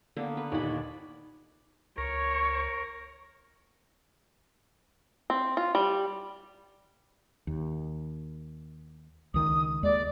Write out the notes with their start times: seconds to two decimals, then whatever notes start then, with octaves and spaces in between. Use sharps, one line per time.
0.16 D3 A#3 B3
0.37 B4
0.52 D#2 A#2 D#4 D5 B5
1.98 C#2 A#4 C#5 C#6
5.30 C4
5.57 F4
5.75 G3
7.47 D#2
9.34 C#2 D#3 D#6
9.83 D#2 G#3 D5